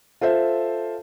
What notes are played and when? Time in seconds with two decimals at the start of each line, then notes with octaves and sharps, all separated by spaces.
0.21 F4 A4 C5 E5